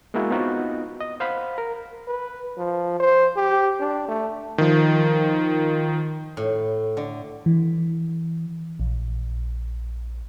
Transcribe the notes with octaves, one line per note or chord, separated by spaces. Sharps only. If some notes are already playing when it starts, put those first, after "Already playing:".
G#3 A#3 B3 E4 F#4
B3 C4 D#4 F4 F#4 D#5
D#5
C5 F5 F#5 B5
A#4
B4
F3
C5
G4
D4
A3
D#3 F3
A2
D3
E3
A#1